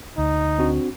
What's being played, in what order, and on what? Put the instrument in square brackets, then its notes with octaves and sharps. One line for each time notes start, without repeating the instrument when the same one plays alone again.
[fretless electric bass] D2 [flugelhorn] D#4
[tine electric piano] C4 D4 F#4